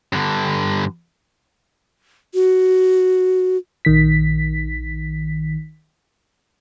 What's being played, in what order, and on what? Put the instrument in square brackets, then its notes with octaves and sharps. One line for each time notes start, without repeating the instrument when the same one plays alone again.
[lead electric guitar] G2 D3
[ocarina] F#4
[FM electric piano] A#1 D#3 B6